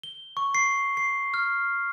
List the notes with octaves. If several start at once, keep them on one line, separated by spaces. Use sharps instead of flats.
G7
C#6
C7
C7
F6